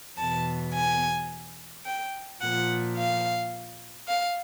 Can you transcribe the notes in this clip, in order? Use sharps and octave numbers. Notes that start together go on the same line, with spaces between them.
E2 B2 A5
G#5
G5
A#2 F3 F#5
F5
F5